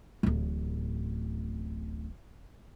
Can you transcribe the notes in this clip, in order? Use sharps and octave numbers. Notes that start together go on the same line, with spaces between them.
D1 A1